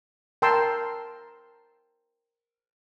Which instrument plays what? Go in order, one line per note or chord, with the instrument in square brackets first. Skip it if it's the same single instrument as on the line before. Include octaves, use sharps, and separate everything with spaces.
[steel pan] A#4 G5 A5 A#5 C6 E6